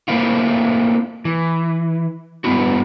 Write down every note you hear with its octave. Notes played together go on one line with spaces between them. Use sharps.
A3 A#3 C4 E4 F4
E3
G2 D3 A3 B3 E4 F#4